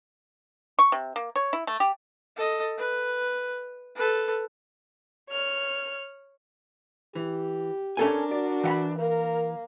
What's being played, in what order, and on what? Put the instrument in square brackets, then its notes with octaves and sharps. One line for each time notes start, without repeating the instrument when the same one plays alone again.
[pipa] C#6
C3
A#3
C#5
E4
A3
G4
[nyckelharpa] A4 D#5
B4
A4 B4
[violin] C#5 F6
[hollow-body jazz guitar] E3 [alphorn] G4
[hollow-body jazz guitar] C#4 A4 G#5 [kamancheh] D4 A#4
[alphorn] F#4 [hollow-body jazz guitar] D5
[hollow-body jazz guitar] E3 F#5 B5
[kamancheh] A#3 [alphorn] A#4